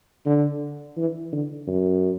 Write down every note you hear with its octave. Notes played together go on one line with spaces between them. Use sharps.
D3
E3
D3
F#2